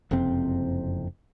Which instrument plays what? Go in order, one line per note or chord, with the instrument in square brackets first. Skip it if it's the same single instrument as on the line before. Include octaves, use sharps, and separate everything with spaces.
[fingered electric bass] F#1 F2 C3 C4